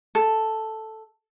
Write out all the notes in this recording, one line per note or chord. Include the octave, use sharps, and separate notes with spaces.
A4